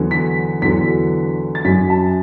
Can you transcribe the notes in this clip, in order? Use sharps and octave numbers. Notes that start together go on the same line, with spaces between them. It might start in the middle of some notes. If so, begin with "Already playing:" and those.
Already playing: E2 D3 F#3
B6
E2 D3 F#3 B6
A6
F#2 F#3 B6
A5